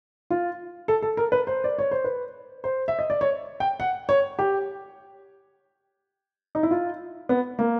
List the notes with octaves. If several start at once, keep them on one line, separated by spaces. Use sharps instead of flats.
F4
A4
A4
A#4
B4
C5
D5
C#5
C5
B4
C5
E5
D#5
D5
C#5
G5
F#5
C#5
G4
D#4
E4
F4
B3
A#3